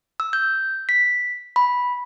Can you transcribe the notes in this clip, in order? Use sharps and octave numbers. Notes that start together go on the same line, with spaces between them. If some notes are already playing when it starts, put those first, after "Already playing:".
E6
G6
B6
B5